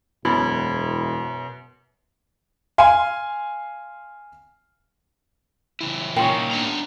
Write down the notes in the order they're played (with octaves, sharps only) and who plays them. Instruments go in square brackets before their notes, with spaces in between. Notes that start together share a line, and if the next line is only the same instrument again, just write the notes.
[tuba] E1 [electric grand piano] F#2 [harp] B2 [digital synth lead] E4
[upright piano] F5 G#5 C6
[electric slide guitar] C#3 E3 E4
[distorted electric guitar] A#2 D#3 [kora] C#4 F4 A#4 [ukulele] G5
[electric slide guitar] B3 D4 A#5